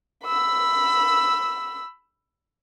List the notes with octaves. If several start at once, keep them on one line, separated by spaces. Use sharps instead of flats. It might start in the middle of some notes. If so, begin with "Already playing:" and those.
B5 E6